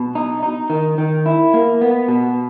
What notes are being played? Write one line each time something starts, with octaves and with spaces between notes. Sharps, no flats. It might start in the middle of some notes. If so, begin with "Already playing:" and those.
Already playing: B2
D#4
D#4
D#3
D#3
E4
A#3
B3
B2